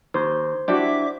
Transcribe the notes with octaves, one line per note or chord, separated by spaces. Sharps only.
D#2 C5
D4 E4 F#4 G4 E5 D6